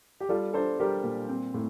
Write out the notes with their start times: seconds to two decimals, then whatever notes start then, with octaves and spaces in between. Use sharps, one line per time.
0.20 G4
0.29 G3 F4 A4
0.54 D4 A4 C5
0.80 G3 G4 A#4
1.04 A#2
1.29 C4
1.54 A2